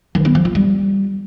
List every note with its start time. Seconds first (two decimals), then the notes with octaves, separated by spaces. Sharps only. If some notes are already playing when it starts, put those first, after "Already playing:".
0.15 D#3
0.25 B3
0.35 F3
0.45 F4
0.55 G3